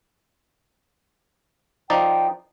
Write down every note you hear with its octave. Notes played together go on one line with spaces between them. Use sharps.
F3 D#4 D5 G5